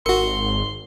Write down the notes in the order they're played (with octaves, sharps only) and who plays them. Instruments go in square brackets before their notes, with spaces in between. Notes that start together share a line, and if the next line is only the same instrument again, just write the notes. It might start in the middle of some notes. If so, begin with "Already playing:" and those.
[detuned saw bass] G#1 [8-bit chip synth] F#4 C#7 [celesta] A#4 [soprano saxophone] C6